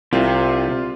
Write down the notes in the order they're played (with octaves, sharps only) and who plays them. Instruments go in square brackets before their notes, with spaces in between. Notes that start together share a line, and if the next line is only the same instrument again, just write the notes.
[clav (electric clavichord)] C2 [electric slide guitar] C3 [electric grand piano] F4